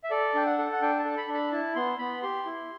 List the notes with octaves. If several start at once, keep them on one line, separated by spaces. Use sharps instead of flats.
E5
A4 D5
D4 G5
F#5
A4
F#5
D4 G5
A5
A4
B5
D4
B5
E4 A5
B3 C6
B3 B5
G4 C6
E4